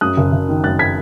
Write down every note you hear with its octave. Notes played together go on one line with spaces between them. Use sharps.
F#2 D#6 F#6
F#1
F#1
D#3
F#2 F#6 A6
G#6 B6